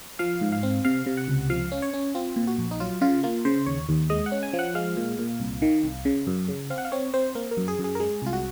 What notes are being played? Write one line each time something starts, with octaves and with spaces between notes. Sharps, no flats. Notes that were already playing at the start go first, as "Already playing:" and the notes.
F3 F5
G#2
F5
C4
C3 F5
C3
F#5
C#2
F3 F5
C#4
C#5
C#4
C4 F4
A#2
F#4
A#1
D#4
F#3 F4
C#3 F4
A#3 F4
C#3 C5
D#2 C#5
D#2
G#3 D#5
F#5
C#4
G#5
F3
F#5
G#3 F5
A#2
A#2
C2
D#3
C2
C#3
F#2
C#3
C4 F5
F#5
F5
C4 C#5
C4 C5
A#3 A#4
A#4
F#2
G#4
F#2
G#4
A#4
G#3 G#4
C2 F4
F#4